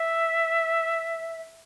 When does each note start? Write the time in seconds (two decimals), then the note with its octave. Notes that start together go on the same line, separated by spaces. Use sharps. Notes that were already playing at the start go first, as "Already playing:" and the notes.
Already playing: E5